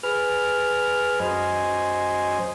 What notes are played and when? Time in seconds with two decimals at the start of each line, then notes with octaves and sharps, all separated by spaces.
0.03 G#4 B4 F6
1.20 F#2 C5 D#5 G#5